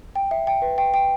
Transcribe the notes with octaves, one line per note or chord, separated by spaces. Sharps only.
G5
E5
G5
B4
G5
G5